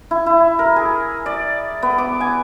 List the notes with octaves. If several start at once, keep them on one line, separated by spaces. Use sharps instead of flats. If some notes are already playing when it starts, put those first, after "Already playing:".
E4
E4
A#4
G#4
D5
B3
D6
G#5